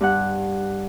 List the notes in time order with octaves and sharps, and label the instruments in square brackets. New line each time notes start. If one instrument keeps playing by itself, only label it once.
[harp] G2 F#5